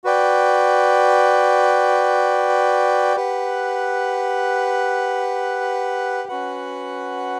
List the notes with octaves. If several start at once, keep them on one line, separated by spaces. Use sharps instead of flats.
F#4 B4 D5 G5
G4 B4 F#5
C#4 F#4 B4 F#5